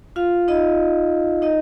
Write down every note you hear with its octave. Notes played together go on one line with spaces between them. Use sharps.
F4 F5
D#4 D#5
D#4 D#5